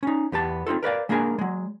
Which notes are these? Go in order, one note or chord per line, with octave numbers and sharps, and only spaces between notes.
C#4 D#4
E2 B3 G4 A5
C4 D#4 F4 A4
A#4 B4 D5 F5
G#3 A#3 D4 G#4 A#4 G#5
F#3 G#3